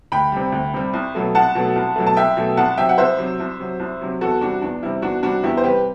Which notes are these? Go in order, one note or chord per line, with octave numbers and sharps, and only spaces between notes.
D2 G5 B5
C3 G3
D2
C3 G3
C2
B2 F#3 A3
C2 F#5 A5
B2 F#3 A3
C2
B2 F#3 A3
A5
C2 E5 G5
B2 F#3 A3
C2 F#5 A5
C3 F#3 E5 G5
F#5
C2 C5 E5
C3 F#3
C2
C3 F#3
C2
C3 F#3
E2 F#4 A4
C3 G3 D4 F#4
E2 D4
C3 G3 E4
E2 D4 F#4
C3 G3 D4 F#4
E2 E4 G4
C5
C3 G3 G4 B4